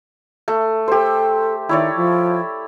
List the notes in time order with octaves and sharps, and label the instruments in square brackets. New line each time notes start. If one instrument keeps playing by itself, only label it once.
[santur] A3
[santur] G4 C5 [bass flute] A4
[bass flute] D#3 [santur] E4 C#5 D5
[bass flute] F3